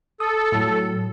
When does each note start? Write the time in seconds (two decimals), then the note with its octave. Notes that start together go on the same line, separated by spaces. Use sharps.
0.20 A4 D#6
0.52 A2 F#3